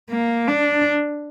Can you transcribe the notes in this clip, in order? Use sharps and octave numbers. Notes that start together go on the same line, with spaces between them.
A#3
D4